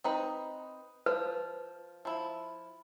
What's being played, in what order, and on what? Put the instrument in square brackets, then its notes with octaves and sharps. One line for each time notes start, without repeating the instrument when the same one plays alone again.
[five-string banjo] C4 D#4 B4
[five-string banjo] F3 [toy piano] B4
[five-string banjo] F3 E4